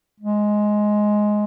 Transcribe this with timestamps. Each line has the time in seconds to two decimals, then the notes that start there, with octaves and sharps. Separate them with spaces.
0.20 G#3